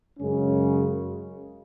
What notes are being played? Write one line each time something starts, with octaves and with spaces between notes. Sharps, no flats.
F#2 C#3 G#3 C#4